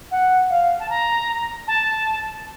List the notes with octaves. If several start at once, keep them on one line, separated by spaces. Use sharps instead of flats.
F#5
F5
A5
A#5
A5